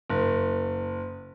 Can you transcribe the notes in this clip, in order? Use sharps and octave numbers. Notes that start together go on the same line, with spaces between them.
F#1